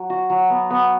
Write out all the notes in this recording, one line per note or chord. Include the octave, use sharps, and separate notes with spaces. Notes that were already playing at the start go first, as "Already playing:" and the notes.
Already playing: F#3
F#4
F#3
B3
B3